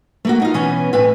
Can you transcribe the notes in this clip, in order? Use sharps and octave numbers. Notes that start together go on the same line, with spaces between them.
A3 A#3 F#4
D#4 F4
B2 E3 B3 C#4 G#5
A2 C4 B4 E5 G#5